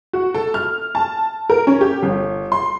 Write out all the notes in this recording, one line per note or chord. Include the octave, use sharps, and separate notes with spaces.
F#4
A4
F6
A5
A#4
C#4
G4
G1
C6